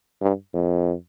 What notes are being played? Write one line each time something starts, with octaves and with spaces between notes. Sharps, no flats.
G2
F2